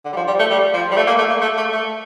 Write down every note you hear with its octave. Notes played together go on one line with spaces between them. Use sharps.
D3
G3
F3
G3
A3
G3
F3
G3
A3
A#3
A3
A#3
A3
A3
A3